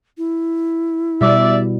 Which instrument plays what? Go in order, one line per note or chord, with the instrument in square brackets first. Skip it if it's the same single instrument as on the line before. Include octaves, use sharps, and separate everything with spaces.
[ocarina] E4
[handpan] B2 G3 [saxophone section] D5 E5